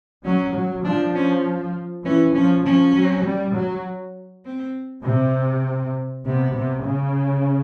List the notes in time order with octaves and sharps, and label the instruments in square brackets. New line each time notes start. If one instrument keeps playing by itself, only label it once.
[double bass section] F#3 [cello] C#4
[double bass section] F#3
[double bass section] F3 [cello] D4
[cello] C#4
[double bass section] E3 [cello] C#4
[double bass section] F3 [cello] C#4
[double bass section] F3 [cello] C#4
[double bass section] F#3
G3
F#3
[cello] C4
[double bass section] C3 [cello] C4
[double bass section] C3 [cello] B3
[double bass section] C3
C#3